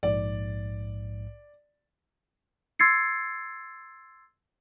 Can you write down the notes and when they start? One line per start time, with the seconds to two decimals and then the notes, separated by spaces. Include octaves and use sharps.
0.03 A#1 G#2 D5
2.79 C6 E6 G#6 A6 C7 C#7